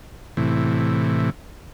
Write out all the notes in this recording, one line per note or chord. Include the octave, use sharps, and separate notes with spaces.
A2 C3 E3